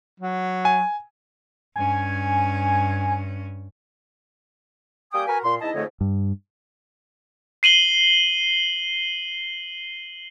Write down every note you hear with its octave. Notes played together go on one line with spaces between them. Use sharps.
F#3
G#5
G2 C#4 G#5
G3 A#3 G5 G#5 D#6
F#4 A#4 B4 F#5 G#5
A#2 C6
E2 D#4 E4 D#5 A5
F2 G#2 D3 A3 C#5 D#5
G2
C7 D#7 F#7 G7